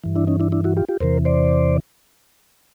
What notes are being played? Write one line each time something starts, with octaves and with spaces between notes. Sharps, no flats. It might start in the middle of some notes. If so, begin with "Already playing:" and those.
G2 E3
D4 E4
C#4 D#4
D4 E4
D4 E4
E4 F#4
F4 G4
F4 G4
E2 C3 E3 A#4 C5
C5 D5